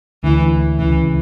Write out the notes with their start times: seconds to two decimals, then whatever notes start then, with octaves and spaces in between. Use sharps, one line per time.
0.23 D2 D3 E3
0.51 D2 D3
0.78 C#2 C#3 E3